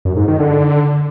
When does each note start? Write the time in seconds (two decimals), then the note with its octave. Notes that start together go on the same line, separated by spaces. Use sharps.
0.05 F#2
0.17 G#2
0.28 D#3
0.39 D3